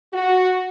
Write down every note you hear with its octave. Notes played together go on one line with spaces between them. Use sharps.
F#4